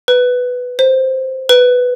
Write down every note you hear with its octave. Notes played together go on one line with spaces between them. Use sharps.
B4
C5
B4